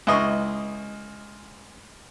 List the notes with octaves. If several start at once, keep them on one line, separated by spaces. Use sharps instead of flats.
C#2 E4 D#5 C6 C#6